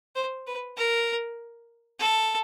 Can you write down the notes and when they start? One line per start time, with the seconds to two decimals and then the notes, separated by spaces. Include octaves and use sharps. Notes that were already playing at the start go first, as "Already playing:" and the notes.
0.15 C5
0.47 B4
0.77 A#4
1.99 A4